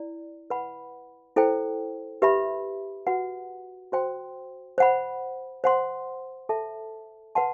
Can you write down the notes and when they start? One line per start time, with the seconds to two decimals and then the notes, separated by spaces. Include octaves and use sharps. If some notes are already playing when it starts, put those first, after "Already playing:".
Already playing: E4 D5
0.50 B4 F#5 B5
1.36 E4 A4 C5 G5
2.22 G4 B4 E5 B5
3.07 F#4 B4 F#5
3.92 F#4 C5 G5 C6
4.78 C5 F#5 B5
5.64 C5 F#5 C6
6.49 A4 E5 A5
7.35 B4 F#5 A5 C6